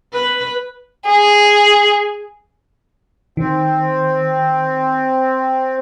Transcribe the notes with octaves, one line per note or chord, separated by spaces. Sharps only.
B4
G#4
D#3 C4